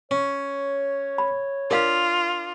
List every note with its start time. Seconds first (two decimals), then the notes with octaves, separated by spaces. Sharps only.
0.11 C#4 C#5
1.18 B5
1.71 D4 F4 A#4 F5